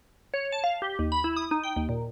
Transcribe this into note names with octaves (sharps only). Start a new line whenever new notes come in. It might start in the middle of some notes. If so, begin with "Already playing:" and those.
C#5
A5
F5
G4
D#2
B5
E4
D#6
D#4
G5
D#2
A#2